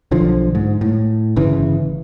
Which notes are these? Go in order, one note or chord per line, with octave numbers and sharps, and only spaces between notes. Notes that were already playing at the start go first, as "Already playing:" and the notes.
B1 D3 F3
G#2
A2
G1 C#3 E3